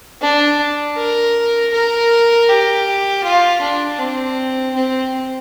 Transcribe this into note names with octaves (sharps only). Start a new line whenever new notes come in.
D4
A#4
A#4
G4
F4
D4
C4
C4